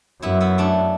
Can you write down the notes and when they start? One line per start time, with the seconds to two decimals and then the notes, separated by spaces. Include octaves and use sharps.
0.22 F#2 B3 E4
0.41 B3 E4
0.58 A3 D4